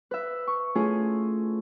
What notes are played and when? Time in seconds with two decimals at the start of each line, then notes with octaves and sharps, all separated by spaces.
0.11 B4 E5
0.47 C#6
0.75 A3 C#4 E4 F4 G#4